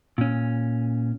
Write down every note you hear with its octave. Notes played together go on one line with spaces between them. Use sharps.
A#2 C#4